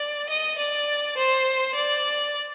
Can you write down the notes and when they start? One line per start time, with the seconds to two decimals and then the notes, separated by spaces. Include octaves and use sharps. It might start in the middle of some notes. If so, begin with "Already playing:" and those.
Already playing: D5
0.29 D#5
0.58 D5
1.17 C5
1.75 D5